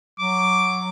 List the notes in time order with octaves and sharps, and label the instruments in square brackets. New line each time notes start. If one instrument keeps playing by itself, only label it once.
[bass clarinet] F#3 [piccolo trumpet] D6